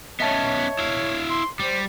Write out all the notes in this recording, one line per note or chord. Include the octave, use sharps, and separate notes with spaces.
B3 C#4 C#5 D#5 E5 A5
E4 F5
C6
G3 C5